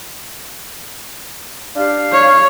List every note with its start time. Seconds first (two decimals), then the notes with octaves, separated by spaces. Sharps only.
1.75 D4 G4 F5
2.12 C#5